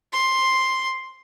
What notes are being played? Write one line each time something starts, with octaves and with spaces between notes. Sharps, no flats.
C6